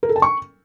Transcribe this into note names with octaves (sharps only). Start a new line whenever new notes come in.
A#4
A4
A5
C#6